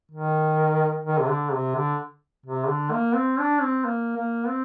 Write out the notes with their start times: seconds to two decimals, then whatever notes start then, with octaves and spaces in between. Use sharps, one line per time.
0.11 D#3
1.05 D#3
1.20 C3
1.29 D3
1.53 C3
1.75 D3
2.46 C3
2.68 D3
2.92 A#3
3.15 C4
3.39 D4
3.62 C4
3.85 A#3
4.17 A#3
4.48 C4